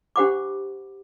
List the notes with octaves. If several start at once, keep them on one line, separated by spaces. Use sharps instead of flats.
D4 G4 C5 F#5 B5 D6